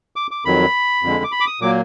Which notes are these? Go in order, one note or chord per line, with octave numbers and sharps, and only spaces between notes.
D6
D6
F2 D#3 F#3 B5
F2 D3 G#3
D6
B5
D6
D#6
A#2 F#3 A#3 D6